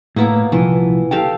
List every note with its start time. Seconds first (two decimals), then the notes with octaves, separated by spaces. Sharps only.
0.16 A2 A#3 B3 E4
0.52 C2 A#2 E3 F3
1.11 G4 A4 F5 G5